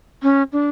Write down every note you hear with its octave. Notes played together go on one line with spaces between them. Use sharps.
C#4
D4